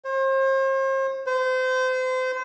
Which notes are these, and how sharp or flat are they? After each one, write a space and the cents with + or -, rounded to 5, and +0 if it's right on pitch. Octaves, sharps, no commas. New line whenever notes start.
C5 +40
C5 -30